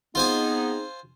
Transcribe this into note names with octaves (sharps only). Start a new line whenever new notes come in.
B3 C4 D#4 F4 G#4 C5 G#5